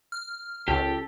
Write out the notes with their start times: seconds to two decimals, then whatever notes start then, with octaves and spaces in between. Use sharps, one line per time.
0.12 F6
0.68 C#2 G4 A4